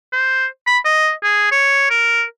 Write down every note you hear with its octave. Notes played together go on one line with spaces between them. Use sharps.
C5
B5
D#5
G#4
C#5
A#4